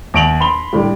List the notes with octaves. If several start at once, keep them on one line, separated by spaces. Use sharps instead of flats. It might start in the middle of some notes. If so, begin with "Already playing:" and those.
D#2 A#6 D7 F7 F#7
B5 C6 F7 G7
A2 D3 G3 G4